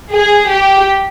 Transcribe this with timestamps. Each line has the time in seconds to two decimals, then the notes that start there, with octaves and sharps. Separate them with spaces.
0.12 G#4
0.49 G4